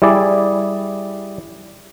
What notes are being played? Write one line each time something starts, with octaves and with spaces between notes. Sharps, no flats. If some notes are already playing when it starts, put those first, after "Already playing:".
G3 E4 G#4 D5